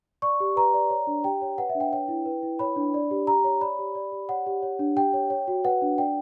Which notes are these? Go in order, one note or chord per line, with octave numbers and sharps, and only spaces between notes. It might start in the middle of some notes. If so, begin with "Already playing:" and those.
D5 C#6
G4
B4 A#5
D5
C#5
D4
G4 G5
C#5
B4 F#5
E5
D4
G5
C#5 G5
E4
B4
E4
C#5 B5
D4
D5
G4
G4 A#5
C#5
D5 B5
G4
D5
G4
C#5 F#5
G4
C#5
D4
G4 G5
C#5
C#5
F#4
B4 F#5
D4
D5 G5